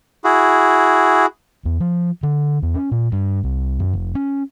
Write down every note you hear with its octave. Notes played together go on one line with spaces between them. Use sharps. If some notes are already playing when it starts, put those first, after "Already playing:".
E4 F#4 G#4
E2
F3
D3
E2
C#4
A#2
G2
C2
F#2
F1
C#4